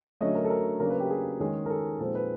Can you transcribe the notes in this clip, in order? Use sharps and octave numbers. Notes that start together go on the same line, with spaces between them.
D3 F#3 A3 C#4 D#5
A#4
A4
A#4
C#3 F#3 A#3 D4 A#4
B4
G4
G#4
D#3 G#3 C#4 G#4
A#4
A4
A#2 F3 G#3 C4 D#4 A4
B4